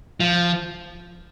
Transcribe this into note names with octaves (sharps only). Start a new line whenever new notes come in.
F3